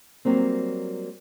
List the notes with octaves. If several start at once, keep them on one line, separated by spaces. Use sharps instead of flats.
F#3 G3 A#3 C4